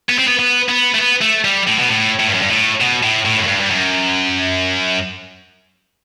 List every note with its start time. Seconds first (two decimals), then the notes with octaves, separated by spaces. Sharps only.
0.10 B3
0.19 C4
0.28 B3
0.39 B3
0.69 B3
0.94 A3
0.99 B3
1.22 A3
1.45 G3
1.67 A2
1.79 B2
1.90 A2
2.20 A2
2.28 G2
2.34 F#2
2.42 G2
2.51 A2
2.80 B2
3.03 A2
3.25 A2
3.37 F#2
3.48 G2
3.60 G2
3.71 F#2